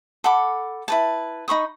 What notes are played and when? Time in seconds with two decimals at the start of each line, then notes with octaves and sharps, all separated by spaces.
0.24 A4 F#5 B5 D6
0.88 E4 B4 A5
1.48 D#4 B5 C#6 D#6